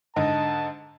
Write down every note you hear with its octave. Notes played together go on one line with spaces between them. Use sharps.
G#2 D3 D#5 A5